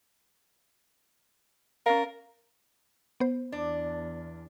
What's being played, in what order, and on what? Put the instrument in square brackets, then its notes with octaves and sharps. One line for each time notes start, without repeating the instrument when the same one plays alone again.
[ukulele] C#4 D5 F5 [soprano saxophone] A#4
[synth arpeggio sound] B3 C5
[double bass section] E2 [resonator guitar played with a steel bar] D4